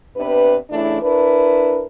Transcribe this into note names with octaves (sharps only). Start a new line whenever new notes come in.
C3 B3 D4 B4
C#3 E3 A3 D4 E4
D4 E4 A#4 B4